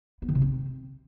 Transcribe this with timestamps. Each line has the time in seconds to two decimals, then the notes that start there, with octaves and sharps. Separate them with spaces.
0.22 B3
0.29 D#3
0.35 C3
0.42 C4